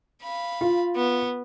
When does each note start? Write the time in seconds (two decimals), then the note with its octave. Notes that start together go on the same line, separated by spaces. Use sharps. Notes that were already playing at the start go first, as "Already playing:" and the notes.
0.22 F5 B5
0.61 F4
0.96 B3